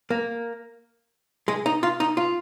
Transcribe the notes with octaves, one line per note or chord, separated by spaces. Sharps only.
A#3
G#3
D#4
F4
D#4
F4